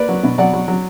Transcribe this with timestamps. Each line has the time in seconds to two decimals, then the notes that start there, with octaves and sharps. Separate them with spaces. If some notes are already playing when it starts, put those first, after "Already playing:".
Already playing: A#3 B4 D5
0.09 F#3
0.23 B2
0.38 F#3 D5 F#5
0.53 F#3
0.68 F#3